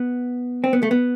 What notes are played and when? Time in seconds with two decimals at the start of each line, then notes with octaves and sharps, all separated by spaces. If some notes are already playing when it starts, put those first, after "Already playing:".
Already playing: B3
0.64 C4
0.73 B3
0.83 A3
0.91 B3